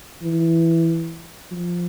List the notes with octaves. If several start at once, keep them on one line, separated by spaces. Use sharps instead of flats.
E3
F3